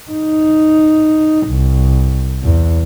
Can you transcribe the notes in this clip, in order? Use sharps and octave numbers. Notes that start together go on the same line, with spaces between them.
D#4
C2
E2